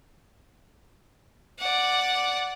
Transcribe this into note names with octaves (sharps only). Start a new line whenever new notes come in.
D5 F#5